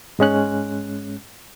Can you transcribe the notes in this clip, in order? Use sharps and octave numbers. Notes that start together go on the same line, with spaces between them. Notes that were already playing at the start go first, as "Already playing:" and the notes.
G#2 G#3 C#4 F#6